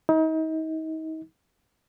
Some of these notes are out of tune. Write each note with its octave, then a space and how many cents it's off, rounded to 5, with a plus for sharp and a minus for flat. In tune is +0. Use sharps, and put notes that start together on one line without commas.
D#4 +35